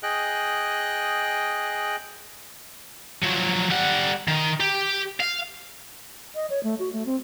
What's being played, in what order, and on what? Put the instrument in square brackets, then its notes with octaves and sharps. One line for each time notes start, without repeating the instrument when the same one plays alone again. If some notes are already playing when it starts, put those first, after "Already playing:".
[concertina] G#4 D#5 G5 F#6
[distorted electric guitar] F3 F#3
G3 F#5
D#3
G4
F5
[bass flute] D#5
C#5
A3
F#4
A3
C4